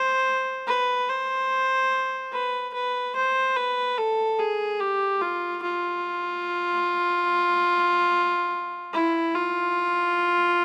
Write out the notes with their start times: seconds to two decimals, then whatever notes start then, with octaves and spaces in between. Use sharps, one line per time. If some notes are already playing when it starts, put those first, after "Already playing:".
Already playing: C5
0.67 B4
1.08 C5
2.33 B4
2.74 B4
3.16 C5
3.57 B4
3.98 A4
4.39 G#4
4.80 G4
5.21 F4
5.62 F4
8.93 E4
9.35 F4